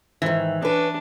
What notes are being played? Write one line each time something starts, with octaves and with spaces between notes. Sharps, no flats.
G#2 D#3 E3
C#4 D4 B4